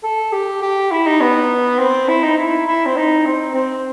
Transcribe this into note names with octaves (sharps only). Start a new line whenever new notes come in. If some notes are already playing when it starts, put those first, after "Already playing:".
A4
G4
G4
E4
D#4
B3
C4
E4
D#4
E4
E4
C4
D#4
C4
C4